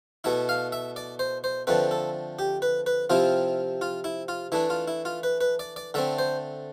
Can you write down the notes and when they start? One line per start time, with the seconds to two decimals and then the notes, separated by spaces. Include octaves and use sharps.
0.24 B2 A3 E4 E5
0.49 F5
0.72 E5
0.96 D5
1.19 C5
1.44 C5
1.67 D3 F3 A3 C4 B4
1.91 A4
2.39 G4
2.62 B4
2.86 B4
3.10 C3 F3 C4 E4 F4
3.81 F4
4.04 E4
4.28 F4
4.52 E3 A3 D4 E4
4.70 F4
4.88 E4
5.05 F4
5.23 B4
5.41 B4
5.59 D5
5.76 D5
5.94 D3 A3 C4 E5
6.19 C5